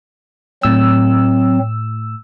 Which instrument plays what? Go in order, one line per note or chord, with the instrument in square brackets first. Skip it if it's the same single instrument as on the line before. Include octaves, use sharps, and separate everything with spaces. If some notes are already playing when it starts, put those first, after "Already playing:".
[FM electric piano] A2 E6 [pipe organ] F#3 C4